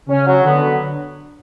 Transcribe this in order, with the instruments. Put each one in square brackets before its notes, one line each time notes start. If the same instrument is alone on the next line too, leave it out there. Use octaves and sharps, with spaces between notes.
[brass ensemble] C#3 [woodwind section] C#4
[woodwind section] F#3
[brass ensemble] D3 [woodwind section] B3
[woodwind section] F#3